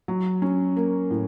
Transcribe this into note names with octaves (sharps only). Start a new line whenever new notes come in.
F#3
C#4
A#3
A2